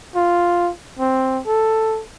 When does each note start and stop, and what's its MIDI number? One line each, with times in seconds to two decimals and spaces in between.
0.15 0.70 65
0.99 1.40 60
1.46 2.02 69